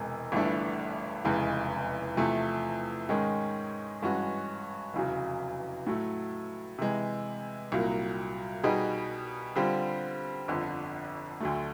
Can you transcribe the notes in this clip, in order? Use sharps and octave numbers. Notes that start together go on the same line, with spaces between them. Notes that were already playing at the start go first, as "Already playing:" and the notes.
Already playing: E1 E2 C3 G#3
G1 G2 E3 A3 D4
F1 E2 C#3 E3 G#3
E2 C3 F3 A3
G#2 D#3 G#3 C#4
G2 E3 G#3 C#4 F#4
F1 E2 C#3 F#3
A2 F#3 A3
C3 E3 G#3
C2 A#2 F#3 A#3
B2 G3 B3 D#4 G#4
D3 G3 C4 F4
G1 F2 D3
D2 D3 F#3 A3